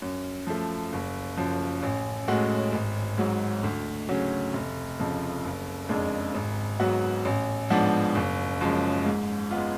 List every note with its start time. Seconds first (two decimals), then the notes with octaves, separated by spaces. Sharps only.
0.02 F#2
0.47 F3 A3
0.93 F#1
1.37 F#2 F3
1.83 A1
2.28 A2 G#3 C#4 F#4
2.72 G#1
3.18 G#2 F#3
3.64 D2
4.09 C#3 F#3 C#4
4.53 F1
4.99 F2 C#3 F3
5.44 F#1
5.89 F2 C#3 G#3 D4
6.35 G#1
6.80 G#2 F#3 B3 F#4
7.25 A1
7.70 G#2 F3 B3 D4
8.15 F#1
8.61 F#2 F3 G#3
9.05 G#2
9.51 G#3 B3 F4